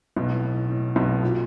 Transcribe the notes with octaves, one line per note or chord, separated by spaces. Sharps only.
B1 B2
A2
A2
B1 B2
A#2